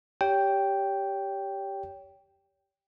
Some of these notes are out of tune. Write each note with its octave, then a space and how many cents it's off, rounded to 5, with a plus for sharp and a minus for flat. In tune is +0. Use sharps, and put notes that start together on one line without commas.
G4 +0 C#5 +30 G5 +0